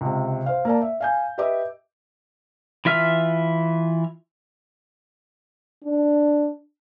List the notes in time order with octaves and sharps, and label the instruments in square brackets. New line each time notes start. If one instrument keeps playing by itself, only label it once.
[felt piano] C#2 C3
C5 F5
A#3 D5 A5
E5
F5 G#5 G6
G4 B4 D#5 E5 D6
[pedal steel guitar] E3 F4 E5 F6
[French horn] D4